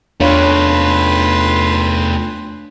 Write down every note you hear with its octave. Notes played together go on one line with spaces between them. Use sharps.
E2 A3 D4 F4 B4 C#5 F5 C6